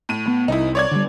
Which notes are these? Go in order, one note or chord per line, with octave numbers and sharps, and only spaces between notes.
A2 D#7
B3
C2 D#4 E4
C#5 D5 G#6
D3 E3 G3